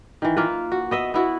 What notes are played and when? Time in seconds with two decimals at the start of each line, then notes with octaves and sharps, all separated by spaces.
0.22 D#3 E3
0.37 A#3 F4 B4
0.72 F#4
0.91 B3 D#5 E5
1.14 B3 E4 F#4